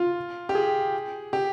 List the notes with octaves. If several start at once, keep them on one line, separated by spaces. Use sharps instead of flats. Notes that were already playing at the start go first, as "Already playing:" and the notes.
Already playing: F4
G4
G#4
G4